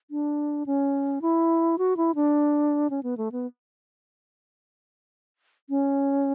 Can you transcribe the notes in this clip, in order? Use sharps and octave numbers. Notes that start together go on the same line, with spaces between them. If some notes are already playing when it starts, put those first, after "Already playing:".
D4
C#4
E4
F#4
E4
D4
C#4
B3
A3
B3
C#4